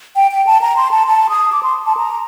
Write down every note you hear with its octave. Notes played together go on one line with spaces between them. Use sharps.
G5
G5
A5
A#5
C6
A5
A5
D#6
D6
C6
A5
A#5